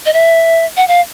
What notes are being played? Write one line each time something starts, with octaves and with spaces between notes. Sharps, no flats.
D#5
E5
F#5
F5